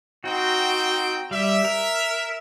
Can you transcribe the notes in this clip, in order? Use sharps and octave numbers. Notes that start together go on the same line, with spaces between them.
C4 D#4 F#4 G5
G3 E5
A#4